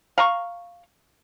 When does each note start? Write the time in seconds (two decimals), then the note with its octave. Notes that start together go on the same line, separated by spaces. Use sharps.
0.18 F5 A#5 C#6